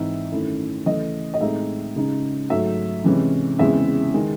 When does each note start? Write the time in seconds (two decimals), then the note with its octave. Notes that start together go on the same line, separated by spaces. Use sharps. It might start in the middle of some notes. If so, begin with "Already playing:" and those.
Already playing: G#2 E3 C4 D#4 E5
0.32 F#2 D#3 A3 C#4 E4
0.86 C#3 E3 A3 D#5
1.34 D#5
1.41 A2 G#3 C4 D#4 E5
1.96 C#2 C#3 G#3 D#4
2.50 G#2 F#3 A3 E5
3.04 C3 E3 G#3 C#4 E4
3.59 E2 C#3 G#3 C4 E4 E5
4.14 D#3 G#3